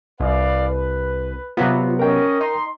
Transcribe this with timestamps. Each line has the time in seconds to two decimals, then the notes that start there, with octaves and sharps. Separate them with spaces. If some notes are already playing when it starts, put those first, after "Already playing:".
0.20 C2 B4 D5 F5
0.68 B4
1.57 C3 F#3 B3 F4
1.99 C#4 A#4 D#5 G5
2.41 D#4 C6